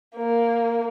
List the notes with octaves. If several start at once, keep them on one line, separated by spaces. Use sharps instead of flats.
A#3